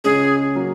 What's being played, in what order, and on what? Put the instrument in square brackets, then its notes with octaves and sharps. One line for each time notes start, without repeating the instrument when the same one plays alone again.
[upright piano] C#2 C#3 G#3 C#4 [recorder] G#4
[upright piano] F#3 A#3